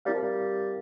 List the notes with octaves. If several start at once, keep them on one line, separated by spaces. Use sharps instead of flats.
G3 C4 E4 A#4 F5
F3
G3